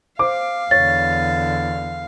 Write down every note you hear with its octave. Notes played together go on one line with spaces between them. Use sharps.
C5 F5 D6
E2 D3 C#5 A6